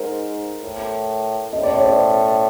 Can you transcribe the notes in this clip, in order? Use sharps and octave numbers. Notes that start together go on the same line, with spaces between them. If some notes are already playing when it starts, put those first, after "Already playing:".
Already playing: G#2 A#4 C5
A2
A2 D#5
D5
C#5
C5 D5